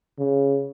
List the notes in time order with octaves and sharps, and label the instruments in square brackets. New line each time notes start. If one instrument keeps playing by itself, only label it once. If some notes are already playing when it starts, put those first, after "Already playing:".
[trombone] C#3